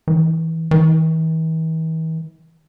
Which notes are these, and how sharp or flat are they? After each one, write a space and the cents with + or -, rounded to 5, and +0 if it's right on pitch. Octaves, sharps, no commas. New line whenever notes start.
E3 -25
E3 -45